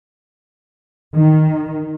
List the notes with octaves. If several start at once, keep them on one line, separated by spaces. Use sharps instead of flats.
D#3